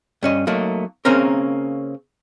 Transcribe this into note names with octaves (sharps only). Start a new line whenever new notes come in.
G2 C#4 D#5
F#3 A3 A#3 D#4
C#3 A#3 C4 C#4 A#4